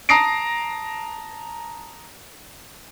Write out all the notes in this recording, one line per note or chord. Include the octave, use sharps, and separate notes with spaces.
A5 A#5 D#6 A#6 C7 D7